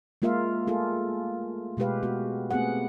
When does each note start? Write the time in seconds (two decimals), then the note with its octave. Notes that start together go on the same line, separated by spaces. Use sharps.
0.22 G#3 A#3 F4 A#4 E5 F5
0.67 A3 F4 G#4 A4
1.77 B2 G#3 A3 G4 B4 F5
2.03 B3 F#4
2.51 A3 B3 C4 G#4 F#5